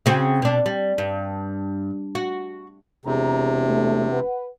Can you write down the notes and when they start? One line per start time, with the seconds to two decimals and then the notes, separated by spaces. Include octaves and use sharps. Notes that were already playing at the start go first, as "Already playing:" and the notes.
0.06 C#3 C4 F#4
0.42 B2 D4
0.66 G3
0.98 G2
2.15 F#4
3.05 E1 C3 G#4 A#5
3.68 A3
4.12 B4 F#5